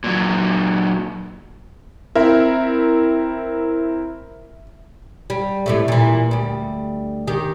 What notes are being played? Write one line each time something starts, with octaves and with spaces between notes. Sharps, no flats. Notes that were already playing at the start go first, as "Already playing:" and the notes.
A#2 F#3
C4 E4 A#4 E5
G3
A2 C3 A3
A#2 E3
D2 G3
D#3 G4